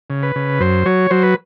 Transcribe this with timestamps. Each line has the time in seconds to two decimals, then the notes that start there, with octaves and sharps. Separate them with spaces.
0.10 C#3
0.23 B4
0.36 C#3
0.60 F#2 C5
0.86 F#3 C#5
1.11 F#3 C5
1.23 B4